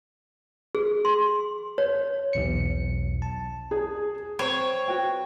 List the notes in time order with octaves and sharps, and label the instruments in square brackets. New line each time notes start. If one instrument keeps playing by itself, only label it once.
[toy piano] G#4
C6
C#5
[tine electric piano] B1 E2 C#7
A5
[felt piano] G#4
[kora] C4 [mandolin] C#5
[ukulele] F#4 B4 G5